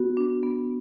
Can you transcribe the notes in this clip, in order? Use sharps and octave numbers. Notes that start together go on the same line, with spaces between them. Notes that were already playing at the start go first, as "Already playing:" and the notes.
Already playing: B3 F#4
D4
B3